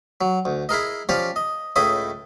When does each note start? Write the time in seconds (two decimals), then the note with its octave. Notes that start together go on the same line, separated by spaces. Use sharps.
0.21 F#3
0.45 D2
0.69 E4 G#4 A#4 D#5
1.09 F3 C#4 G4 C#5 D5
1.36 D#5
1.76 C#2 A2 E4 D#5 D#6